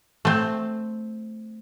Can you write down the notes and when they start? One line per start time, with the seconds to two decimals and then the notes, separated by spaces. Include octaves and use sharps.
0.25 A3 C4